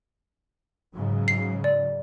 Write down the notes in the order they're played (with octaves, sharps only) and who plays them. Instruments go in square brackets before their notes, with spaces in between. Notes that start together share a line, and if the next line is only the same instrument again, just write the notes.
[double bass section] G#2 C#3 F#3
[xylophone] C7
D5